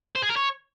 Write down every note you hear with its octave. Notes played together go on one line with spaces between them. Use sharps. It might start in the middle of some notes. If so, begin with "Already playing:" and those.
C5
G#4
A#4
C#5